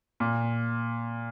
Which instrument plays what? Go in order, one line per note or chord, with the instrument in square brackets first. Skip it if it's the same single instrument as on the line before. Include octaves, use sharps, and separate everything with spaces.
[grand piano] A#2